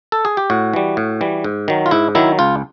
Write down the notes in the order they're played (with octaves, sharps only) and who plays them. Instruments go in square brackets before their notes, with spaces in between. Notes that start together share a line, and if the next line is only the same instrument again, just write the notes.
[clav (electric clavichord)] A4
G#4
G4
A2 F#4
E3 G3
A2
E3 G3
G#2
D#3 F#3
F4
G#2 E4
D#3 F#3 E4
C#2 F4